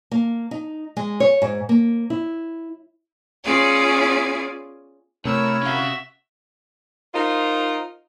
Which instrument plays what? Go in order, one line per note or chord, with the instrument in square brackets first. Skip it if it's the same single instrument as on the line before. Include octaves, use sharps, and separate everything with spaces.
[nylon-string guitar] A#3
D#4
G#3
C#5
G#2
A#3
E4
[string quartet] B3 C#4 F4 G#4 D5 G#5
[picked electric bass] C3 [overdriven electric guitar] A3 [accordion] E4 A#4 C#5 [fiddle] E6
[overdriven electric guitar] C#4 F5 [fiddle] F#4 E5
[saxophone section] D#4 F4 A#4 C5 D#5